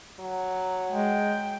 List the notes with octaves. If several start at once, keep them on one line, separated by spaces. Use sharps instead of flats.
F#3
G#3 G5